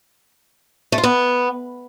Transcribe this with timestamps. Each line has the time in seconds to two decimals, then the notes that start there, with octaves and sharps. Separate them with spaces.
0.92 A3
0.98 F4
1.03 B3